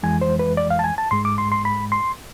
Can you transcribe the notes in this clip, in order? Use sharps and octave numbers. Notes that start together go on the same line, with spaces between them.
F2 E3 G#3 G#5
C5
B4
D5
F5
A5
G#5
A5
G#2 G#3 C6
D6
C6
C6
B5
C6